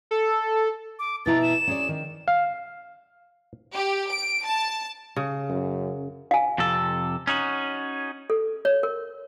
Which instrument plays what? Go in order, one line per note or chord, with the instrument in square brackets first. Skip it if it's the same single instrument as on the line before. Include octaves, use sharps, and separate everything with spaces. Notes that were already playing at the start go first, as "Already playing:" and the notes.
[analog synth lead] A4
[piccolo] D6
[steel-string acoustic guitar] B2 E4 A#5 [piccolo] A6
[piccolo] E7
[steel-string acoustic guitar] C#4 G#4 D5
D#3
[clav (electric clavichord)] F5
[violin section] G4
D7
A5
[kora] C#3
[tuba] F#2
[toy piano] F5 G#5
[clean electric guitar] F2 C3 A4
C#4 D#4 F#4
[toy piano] A4
C#5
A#4